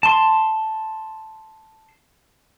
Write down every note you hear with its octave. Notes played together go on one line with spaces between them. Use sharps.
A5 C6